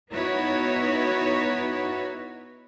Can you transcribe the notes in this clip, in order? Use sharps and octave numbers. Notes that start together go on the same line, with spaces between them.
B3 D#4 E4 F#4 B4 C#5